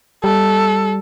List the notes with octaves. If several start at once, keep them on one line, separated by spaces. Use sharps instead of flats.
G3 A4